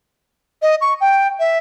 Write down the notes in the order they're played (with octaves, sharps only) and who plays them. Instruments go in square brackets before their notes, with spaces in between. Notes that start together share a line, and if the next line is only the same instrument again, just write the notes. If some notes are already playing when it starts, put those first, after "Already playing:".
[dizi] D#5
C#6
G5
E5